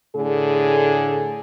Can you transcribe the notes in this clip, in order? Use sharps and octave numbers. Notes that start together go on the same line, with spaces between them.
A2 D3 G#4